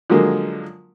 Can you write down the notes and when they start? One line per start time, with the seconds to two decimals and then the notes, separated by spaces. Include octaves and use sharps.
0.10 D3 F3 F#3 G#3 A#3